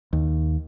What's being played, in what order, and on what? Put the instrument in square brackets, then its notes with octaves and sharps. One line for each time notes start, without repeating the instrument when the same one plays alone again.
[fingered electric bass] D#2